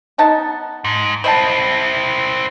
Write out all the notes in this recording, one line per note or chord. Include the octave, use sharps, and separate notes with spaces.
B3 D#4 A5
G#2
C4 E4 C5 D#5 A5